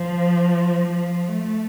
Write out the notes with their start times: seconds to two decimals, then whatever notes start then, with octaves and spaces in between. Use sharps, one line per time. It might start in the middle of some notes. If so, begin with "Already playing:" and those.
Already playing: F3
0.87 F3
1.29 A3